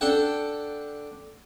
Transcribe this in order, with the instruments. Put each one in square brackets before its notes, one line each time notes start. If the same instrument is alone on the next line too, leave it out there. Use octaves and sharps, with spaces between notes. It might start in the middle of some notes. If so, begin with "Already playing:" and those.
[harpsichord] D4 A4 F#5 G5